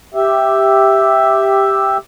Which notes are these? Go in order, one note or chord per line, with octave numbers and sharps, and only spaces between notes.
G4 E5